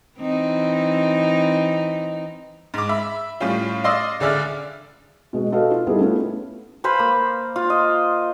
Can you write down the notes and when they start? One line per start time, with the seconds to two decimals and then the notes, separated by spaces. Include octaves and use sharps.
0.19 E3 C4 D#4
2.74 G#2 D6
2.89 E5 B5
3.40 A2 G3 C#4 F4
3.84 D5 D#5 F5 C6 D#6 E6
4.20 C#2 D3 G#4 D5 E5 F6
5.33 B2 G#3
5.52 F#4 A4 B4 D#5 F5
5.71 F4
5.87 G3 B3 D#4 E4 G#4 A4
6.00 A3 B3 C#4 E4 F4 B4
6.84 B4 C5 F5 B5
6.99 A#3
7.56 F4
7.70 D#5